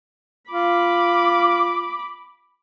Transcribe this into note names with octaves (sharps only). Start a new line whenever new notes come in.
F4 B5 D6